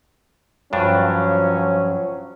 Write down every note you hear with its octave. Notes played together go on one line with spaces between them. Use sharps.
G2 F3 F#3 C#4 D4